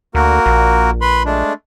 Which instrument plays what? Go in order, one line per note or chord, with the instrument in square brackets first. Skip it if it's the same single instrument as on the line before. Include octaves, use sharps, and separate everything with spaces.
[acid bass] D2 [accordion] A#3 F#4 A#4
[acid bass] A#1
[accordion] B4 B5 C6
G#3 A3 D4